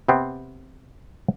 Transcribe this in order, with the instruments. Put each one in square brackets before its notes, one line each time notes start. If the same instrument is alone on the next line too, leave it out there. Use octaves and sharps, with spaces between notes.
[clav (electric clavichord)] C3 B3 C4